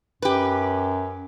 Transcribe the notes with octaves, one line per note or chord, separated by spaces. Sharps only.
F#2 G4 B4